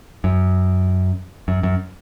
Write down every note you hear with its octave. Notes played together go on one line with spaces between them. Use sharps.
F#2
F#2
F#2